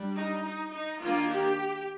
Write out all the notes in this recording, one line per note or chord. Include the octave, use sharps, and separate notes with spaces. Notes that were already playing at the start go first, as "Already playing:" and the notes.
Already playing: G3 D4
D#4
D#4
D#4
D#3 A#3 D4 F4
G4